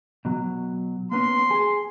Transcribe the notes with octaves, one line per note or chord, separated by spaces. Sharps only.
B2 F#3
A#3 B3 C#4 C6
G#4